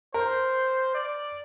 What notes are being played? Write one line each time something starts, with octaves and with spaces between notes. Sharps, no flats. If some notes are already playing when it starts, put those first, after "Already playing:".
A#4 C5
D5